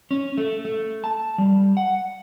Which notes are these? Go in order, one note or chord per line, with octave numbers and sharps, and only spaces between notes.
C#4
A3
A3
A5
G3
F#5